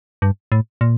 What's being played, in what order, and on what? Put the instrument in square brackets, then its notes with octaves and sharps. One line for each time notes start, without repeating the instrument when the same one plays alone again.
[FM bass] G2
A2
A#2